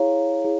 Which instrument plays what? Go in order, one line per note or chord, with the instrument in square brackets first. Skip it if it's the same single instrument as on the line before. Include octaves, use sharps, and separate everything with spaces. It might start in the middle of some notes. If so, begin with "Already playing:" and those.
Already playing: [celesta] E4 G#4 C#5 F5 A#5
E4 G#4